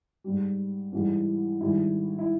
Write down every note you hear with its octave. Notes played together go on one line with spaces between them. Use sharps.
G#2 G3
G#2 E3 G3
G#2 D#3 G3 E4
E4